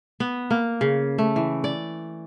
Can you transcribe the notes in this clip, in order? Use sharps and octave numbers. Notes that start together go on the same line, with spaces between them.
B3
A#3
C#3
A3
E3
D5